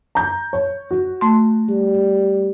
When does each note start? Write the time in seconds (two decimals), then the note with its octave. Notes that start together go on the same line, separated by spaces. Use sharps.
0.15 A#5 G6
0.53 C#5
0.91 F#4
1.21 A3 C6
1.69 G3